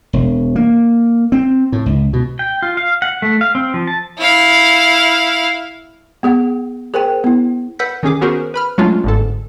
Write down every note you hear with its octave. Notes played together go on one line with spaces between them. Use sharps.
E1
A#3
C4
A2
C#2
B2
G5
F4
F5
F#5
A3
F5
C4
F3
A5
E4 F5
B3 G#4 F#5
G#4 A#4 C5 G5
B3 E4
B4 F#5 E6 G6 B6
D#3 C#4 G#4 D6
B3 C#4 F#4 G#4 A#4 C5
B4 B5 F6
F#3 G#3 A3 C#4 D4 F4
G1 G#2 A4